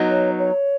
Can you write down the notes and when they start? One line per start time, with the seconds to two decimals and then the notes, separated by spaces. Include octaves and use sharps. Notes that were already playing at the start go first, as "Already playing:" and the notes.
Already playing: F#3 B3 D#4
0.11 C#5
0.39 C#5